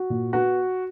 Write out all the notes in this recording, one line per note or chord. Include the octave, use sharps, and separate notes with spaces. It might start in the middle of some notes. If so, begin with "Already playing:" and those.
Already playing: F#4
A#2
B3 F#4